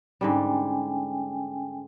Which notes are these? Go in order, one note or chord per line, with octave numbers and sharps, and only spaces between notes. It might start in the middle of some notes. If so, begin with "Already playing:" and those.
G#2 D3 G3 C#4 G5 G#5